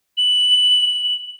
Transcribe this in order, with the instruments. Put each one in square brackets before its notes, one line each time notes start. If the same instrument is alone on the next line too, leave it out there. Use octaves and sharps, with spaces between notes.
[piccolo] F#7